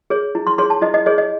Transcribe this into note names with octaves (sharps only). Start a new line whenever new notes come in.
G#4 C#5
E4
C6
G#4 C#5 C6
A5
E4 D#5
D#5
G#4 C#5 D#5
D#5